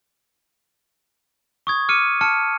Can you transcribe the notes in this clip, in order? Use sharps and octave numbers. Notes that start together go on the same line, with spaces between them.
C#6 D#6 G#6
D6 F6 C#7 D#7
A5 F6 C#7